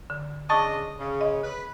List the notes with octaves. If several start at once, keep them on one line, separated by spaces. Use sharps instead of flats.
D3
C#3 D4 D#5 A5 C#6 A6
C#3
D#5
B4